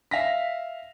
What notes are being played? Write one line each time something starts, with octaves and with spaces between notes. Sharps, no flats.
E5 F5 A#6 B6